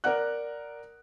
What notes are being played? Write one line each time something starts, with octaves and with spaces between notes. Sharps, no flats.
A#4 D5 F#5 F#6